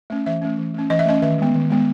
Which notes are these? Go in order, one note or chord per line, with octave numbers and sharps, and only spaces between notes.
A3 C#4
E3 E5
A3 C#4
E3
A3 C#4
E3 D#5
E5
A3 C#4 D#5
D#3 E5
G#3 B3
D#3
G#3 B3